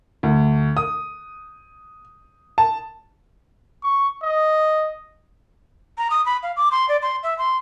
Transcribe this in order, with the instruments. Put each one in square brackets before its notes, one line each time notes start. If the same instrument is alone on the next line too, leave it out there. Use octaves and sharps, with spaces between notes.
[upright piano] D2
D#6
A5
[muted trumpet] C#6
D#5
[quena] A#5
D#6
B5
F5
D6
C6
D5
C6
E5
C6